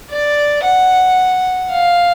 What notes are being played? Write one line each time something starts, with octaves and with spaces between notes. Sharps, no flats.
D5
F#5
F5